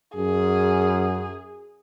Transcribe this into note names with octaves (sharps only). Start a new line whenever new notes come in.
F#2 G#4